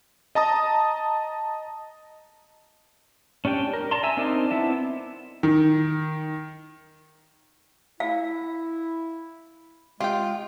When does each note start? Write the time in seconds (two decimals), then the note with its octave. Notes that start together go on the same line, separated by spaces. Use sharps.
0.35 D#5 A5 A#5 D#6
3.45 C#4 D4 G4 G5
3.74 A#4
3.91 D5 A5 A#5 C6
4.03 E5 G#5 A#5 E6
4.17 C4 D4 D#4 A#4 D5
4.51 B3 C4 E4 E5 A5
5.43 D#3
8.00 E4 F5
10.00 G#3 F4 G4 G5